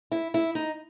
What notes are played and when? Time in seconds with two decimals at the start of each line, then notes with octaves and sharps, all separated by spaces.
0.12 E4
0.34 E4
0.55 D#4